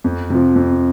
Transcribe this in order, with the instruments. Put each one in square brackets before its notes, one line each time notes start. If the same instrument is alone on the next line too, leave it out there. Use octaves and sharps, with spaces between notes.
[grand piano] F2
C3 F3
F2